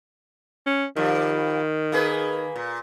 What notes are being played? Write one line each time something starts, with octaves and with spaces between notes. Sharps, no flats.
C#4
D#3 F3 G3
A#3 G#4 B4
A#2